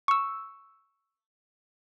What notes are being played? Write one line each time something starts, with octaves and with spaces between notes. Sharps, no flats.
C#6 E6